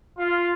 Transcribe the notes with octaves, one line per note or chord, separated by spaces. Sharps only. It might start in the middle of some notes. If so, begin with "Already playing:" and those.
F4